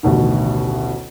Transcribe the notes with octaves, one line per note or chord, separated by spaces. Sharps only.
A1 D2 B2 D#3